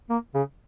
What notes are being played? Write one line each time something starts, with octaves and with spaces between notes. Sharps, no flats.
A#3
C#3